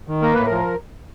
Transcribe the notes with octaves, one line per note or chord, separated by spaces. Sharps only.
D#3
A#3 A#4
A2 B4
A#4
F3